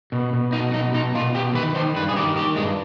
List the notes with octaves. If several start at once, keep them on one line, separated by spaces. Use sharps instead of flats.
B2
B2
B2 D#4
B2 D#4
B2 D#4
B2 F4
B2 G4
D#3 B4
D#3 C5
G2 B4
G#4
D#3 G4
D#3 G4
G2 G#3